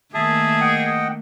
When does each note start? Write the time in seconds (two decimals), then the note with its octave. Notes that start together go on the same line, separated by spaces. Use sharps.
0.14 D#3 A3 A#3 G#4 E5 A5
0.61 D#5 F#5 G5